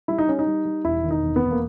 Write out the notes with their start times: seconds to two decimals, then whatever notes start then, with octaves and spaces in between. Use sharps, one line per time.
0.08 G3 E4
0.18 D#4
0.27 G3 C#4
0.39 D#4
0.47 G3
0.65 G3
0.84 E1 E4
1.04 D#3
1.11 D#4
1.23 E1
1.36 B3
1.42 E1
1.51 A#3